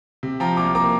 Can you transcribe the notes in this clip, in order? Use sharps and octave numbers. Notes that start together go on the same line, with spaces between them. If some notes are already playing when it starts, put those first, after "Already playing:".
C3
F3 G5 A#5
C2 A#5 D6
A#3 A#5 D6